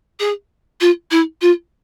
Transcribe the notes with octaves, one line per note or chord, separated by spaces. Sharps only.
G#4
F4
E4
F4